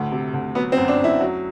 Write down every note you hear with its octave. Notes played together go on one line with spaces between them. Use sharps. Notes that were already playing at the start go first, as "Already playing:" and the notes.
Already playing: D2 A2
C3
D2
F#3 B3
C4
F#2
D4
F#2
E4
F#3